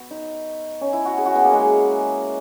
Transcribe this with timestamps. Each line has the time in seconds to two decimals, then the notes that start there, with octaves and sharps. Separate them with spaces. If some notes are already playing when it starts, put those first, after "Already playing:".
Already playing: B3 F#4
0.11 D#4
0.81 C#4
0.93 E4
1.05 F#4
1.18 G#4
1.26 F#4
1.35 B3
1.44 A#3
1.53 G#3